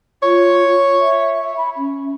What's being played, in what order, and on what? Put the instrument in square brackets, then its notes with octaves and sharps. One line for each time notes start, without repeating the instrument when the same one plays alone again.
[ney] F4 [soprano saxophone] C#5
[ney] E5
B5
C#4